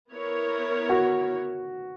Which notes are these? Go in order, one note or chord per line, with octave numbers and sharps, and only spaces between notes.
B3 E4 A#4 C#5
F#4